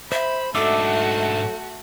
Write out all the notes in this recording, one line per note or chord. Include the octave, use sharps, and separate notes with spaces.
C5 E5 B5
G#2 A3 D4 F#4 A4 E5 D6 E6